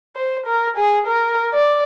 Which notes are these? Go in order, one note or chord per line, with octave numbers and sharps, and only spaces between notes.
C5
A#4
G#4
A#4
D5